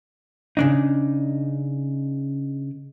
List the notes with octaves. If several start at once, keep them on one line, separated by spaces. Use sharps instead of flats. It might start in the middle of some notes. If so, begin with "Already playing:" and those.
C#3 D4 D#4